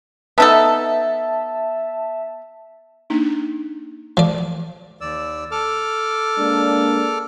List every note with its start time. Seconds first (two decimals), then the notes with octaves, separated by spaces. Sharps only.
0.38 B3 D#4 A4 E5 A5
3.10 A#3 D4 D#4
4.17 E3 F3 D5
5.01 D#2 D5 E6
5.51 A4 D6 F6
6.38 G#3 A#3 D4